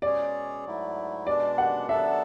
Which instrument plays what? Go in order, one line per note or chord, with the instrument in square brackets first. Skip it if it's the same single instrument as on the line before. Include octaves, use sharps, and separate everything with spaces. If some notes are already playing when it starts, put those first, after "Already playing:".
[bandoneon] B2 G#3 C#4 G#4 C#5 [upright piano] D5
[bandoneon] G#2 F#3 A3 E4
[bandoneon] B2 G#3 D4 [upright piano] D5
[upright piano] F#5
[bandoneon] F#3 B3 D4 A4 [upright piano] E5